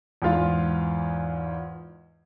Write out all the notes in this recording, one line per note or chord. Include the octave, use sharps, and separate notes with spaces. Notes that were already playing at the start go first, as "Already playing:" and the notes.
E2 G#2 F4 F5